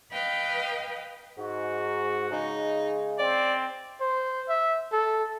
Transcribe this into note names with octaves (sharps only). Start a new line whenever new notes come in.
B4 D#5 F5 G5
G#2 F#4
C#3 G#3 D#4
C4 D5
C5
E5
A4